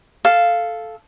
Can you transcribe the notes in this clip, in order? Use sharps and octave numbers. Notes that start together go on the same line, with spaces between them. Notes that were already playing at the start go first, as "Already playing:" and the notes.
A4 F5